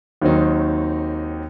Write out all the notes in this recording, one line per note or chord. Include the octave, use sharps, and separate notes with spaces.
D#2 D#3 F#3 C4 D#4